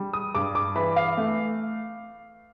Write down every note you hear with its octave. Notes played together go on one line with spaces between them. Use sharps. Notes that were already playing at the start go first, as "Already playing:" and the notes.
Already playing: G3
D#6
G2 D6
D6
E3 B5
F5
A3